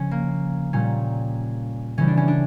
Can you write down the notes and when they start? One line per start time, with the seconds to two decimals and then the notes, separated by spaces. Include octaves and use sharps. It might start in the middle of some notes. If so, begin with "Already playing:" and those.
Already playing: C#3 F3 C#4
0.11 A#3
0.73 A#2 G3 C#4
1.97 C#3 E3 G3 C#4
2.07 D4
2.17 C#4
2.28 D4